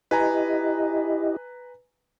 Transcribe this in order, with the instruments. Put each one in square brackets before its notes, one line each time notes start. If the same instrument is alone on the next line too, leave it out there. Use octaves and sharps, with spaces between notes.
[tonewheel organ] E4 G4 D#5 [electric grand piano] B4 G#5 A#5